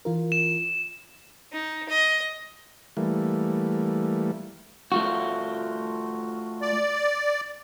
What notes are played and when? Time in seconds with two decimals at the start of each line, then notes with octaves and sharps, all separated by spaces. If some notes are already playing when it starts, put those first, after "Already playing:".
0.05 E3 F4 A#4
0.32 E7
1.52 D#4
1.89 D#5
2.97 E3 G3 A3 A#3
4.92 A3 F4 F#4
6.62 D5